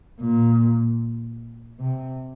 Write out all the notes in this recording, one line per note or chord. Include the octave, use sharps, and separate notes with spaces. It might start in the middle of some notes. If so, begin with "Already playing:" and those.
A#2
C3